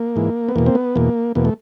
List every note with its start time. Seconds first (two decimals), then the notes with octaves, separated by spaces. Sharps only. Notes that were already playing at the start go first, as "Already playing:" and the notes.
Already playing: A#3
0.16 G#2 E3
0.49 B3
0.56 E2 B2 A#3
0.66 C4
0.75 B3
0.96 E2 B2 A#3
1.35 E2 B2 A#3
1.45 A3